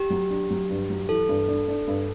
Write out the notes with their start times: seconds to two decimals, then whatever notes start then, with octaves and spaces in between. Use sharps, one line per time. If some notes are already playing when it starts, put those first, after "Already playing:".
Already playing: G4
0.10 F#3
0.30 D4
0.51 F#3
0.70 G2
0.90 F#3
1.09 E3 A4
1.29 G2
1.48 D4
1.68 D4
1.88 G2